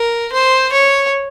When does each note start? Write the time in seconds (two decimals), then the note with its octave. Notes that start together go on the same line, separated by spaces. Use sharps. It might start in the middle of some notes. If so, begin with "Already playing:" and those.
Already playing: A#4
0.32 C5
0.73 C#5